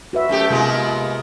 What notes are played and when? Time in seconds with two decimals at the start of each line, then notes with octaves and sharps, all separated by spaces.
0.13 F#4 B4 E5
0.29 F#2 A3 G4
0.50 C3 G#3 A#3 B3 F4